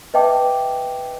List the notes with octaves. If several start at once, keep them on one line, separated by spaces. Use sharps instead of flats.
B4 D#5 E5 G5 A5 D6